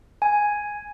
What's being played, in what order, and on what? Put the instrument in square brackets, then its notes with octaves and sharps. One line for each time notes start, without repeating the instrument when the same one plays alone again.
[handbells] G#5